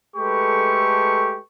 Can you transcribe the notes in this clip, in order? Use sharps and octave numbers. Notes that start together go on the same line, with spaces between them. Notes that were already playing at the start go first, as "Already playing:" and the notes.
G#3 A3 G4 A4 B4 C#6